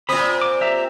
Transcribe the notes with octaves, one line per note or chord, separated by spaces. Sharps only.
A#2 C4 B5 D#6
D6
G4 E5 A#5